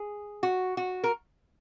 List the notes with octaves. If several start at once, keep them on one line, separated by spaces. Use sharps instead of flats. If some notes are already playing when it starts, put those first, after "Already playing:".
Already playing: G#4
F#4
F#4
A#4